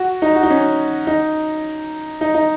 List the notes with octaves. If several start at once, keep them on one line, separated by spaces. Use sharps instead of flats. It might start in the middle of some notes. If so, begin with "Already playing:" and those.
Already playing: F#4
D#4
F#4
D#4
C#4
D#4
D#4
D#4